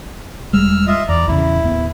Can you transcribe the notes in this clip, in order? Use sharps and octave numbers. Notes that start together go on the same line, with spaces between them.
E1 G3 G#3 E6 F6
F4 D#5 E5
E2 D5 A#5
A#1 E2 C#3 E4
D1 D#2 B3